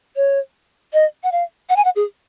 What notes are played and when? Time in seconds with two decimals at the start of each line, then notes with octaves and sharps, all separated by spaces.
0.16 C#5
0.93 D#5
1.23 F#5
1.32 F5
1.69 F#5
1.76 G#5
1.85 F#5
1.96 G#4